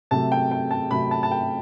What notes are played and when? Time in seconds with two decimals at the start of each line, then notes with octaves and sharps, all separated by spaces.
0.11 C3 F#3 A3 A5
0.32 G5
0.51 G5
0.71 A5
0.91 C3 F#3 A3 B5
1.11 A5
1.23 A5
1.31 G5